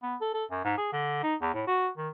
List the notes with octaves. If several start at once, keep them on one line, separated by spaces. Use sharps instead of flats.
B3
A4
A4
F#2
G#2
G#4
D3
D#4
E2
A2
F#4
D#3